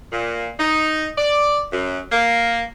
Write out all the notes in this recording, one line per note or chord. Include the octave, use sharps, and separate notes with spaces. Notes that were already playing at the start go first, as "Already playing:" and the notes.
A#2
D#4
D5
F#2
A#3